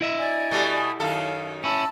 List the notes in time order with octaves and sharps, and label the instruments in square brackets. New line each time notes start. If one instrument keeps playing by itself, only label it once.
[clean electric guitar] E4 D#5 E5
[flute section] D5 G#5
[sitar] B2 G3 A3
[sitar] F#2 D#3 A4 [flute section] F5
[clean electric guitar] C#4 E4 [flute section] A5 E6